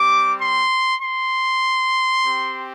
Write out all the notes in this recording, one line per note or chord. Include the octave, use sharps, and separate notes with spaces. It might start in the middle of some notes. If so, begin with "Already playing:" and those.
Already playing: G3 C4 G4 D6
C6
C6
C4 G4